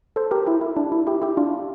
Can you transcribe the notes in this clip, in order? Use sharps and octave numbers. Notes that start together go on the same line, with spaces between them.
A4 C5
G4 A#4
E4 G4
E4
D4
E4
E4 G4
E4 G4
D4 F4